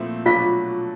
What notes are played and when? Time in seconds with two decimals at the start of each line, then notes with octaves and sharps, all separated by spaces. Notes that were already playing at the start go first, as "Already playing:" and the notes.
Already playing: A#2 F3 A3 C4 E4
0.26 B2 F#3 A3 D4 F4 F5